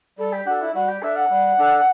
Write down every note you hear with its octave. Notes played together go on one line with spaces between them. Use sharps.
G3 A4
G4
D4 F#4 A4
E4
G3 F#4
G4
D4 A4 E5
F#5
G3
D4 A4